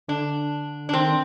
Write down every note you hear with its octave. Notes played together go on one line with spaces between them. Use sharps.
D3 D4
D4
D#3 C4